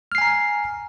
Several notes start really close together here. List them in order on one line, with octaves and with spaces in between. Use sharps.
F6 C7 G#5 A#5